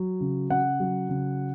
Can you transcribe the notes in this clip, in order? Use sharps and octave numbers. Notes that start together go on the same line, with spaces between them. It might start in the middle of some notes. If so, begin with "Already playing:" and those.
Already playing: F#3
C#3
C#3 F#5
F#3
C#3